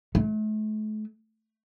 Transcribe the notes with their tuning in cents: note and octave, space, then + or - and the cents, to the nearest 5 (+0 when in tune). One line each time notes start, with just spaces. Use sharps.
A3 -40